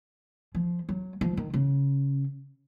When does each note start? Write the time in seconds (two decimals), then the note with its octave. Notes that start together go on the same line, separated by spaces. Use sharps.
0.55 F3
0.89 F#3
1.21 F3
1.37 D#3
1.54 C#3